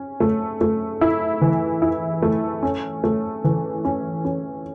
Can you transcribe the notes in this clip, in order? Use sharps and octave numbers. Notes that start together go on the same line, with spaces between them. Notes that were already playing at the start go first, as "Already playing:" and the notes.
Already playing: C#4
A3
A3
E4
E3
E4
A3
C#4
A3
E3
C#4
C#4